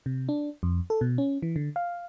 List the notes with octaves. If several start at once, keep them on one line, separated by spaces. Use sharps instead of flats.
C3
D4
F2
A4
B2
C#4
E3
D3
F5